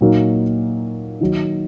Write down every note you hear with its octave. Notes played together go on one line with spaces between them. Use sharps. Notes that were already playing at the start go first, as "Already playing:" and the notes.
A#2 F#3 A#3 D#4
D#3 F#3 D#4